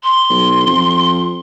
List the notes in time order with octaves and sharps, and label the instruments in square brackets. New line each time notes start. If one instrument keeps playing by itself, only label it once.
[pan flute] C6
[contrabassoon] B1
F2